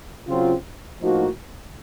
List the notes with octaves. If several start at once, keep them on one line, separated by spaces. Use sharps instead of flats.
C#3 F#3 C4 F4
A2 F3 A#3 D#4 F#4